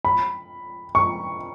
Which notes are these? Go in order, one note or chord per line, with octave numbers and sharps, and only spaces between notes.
B5
C#6